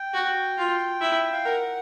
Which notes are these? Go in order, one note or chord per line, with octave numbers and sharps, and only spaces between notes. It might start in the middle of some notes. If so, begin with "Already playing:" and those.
Already playing: G5
F#4
F4
E4
F5
A#4 F#5